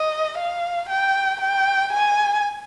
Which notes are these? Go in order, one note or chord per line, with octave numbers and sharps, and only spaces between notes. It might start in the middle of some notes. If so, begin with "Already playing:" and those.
Already playing: D#5
F5
G5
G5
G#5